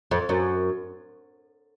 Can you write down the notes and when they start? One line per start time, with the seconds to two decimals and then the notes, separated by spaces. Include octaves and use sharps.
0.11 F2
0.29 F#2